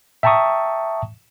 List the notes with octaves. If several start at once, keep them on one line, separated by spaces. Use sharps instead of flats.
E5 G5 A5 A#5 C#6 D#6